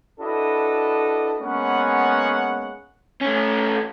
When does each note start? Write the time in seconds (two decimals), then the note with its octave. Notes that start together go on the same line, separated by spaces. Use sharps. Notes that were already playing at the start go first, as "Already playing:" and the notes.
0.20 D4 E4 F#4 A4 B4 D#5
1.41 G#3 A#3 B3 C#4 F#5
3.21 A3 C#4